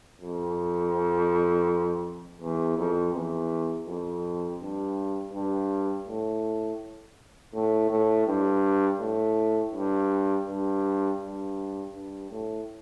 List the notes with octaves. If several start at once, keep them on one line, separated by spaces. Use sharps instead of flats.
F2
E2
F2
E2
F2
G2
G2
A2
A2
A2
G2
A2
G2
G2
G2
G2
A2